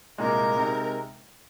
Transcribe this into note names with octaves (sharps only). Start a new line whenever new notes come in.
C2 A#2 G#3 A#4
C3 G#3 D#4